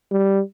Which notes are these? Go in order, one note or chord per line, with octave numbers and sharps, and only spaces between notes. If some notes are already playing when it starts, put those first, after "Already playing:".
G3